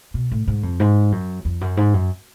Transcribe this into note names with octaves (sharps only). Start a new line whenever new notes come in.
B2
A2
G#2
F2
G#2
F#2
F2
F#2
G#2
F#2